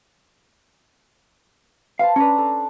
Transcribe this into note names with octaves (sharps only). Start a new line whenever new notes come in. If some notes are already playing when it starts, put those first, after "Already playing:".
B4 C5 F5 A5
C#4 D4 B4 D5 A#5
A4